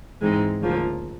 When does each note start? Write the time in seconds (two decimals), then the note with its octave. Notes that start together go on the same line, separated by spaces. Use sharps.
0.21 G#2 E3 G#3 C4 D#4
0.60 D2 C#3 F3 A#3